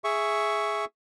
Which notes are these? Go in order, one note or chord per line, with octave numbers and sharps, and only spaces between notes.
G#4 E5 C#6